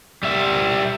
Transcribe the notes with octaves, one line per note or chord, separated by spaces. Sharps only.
G3 E5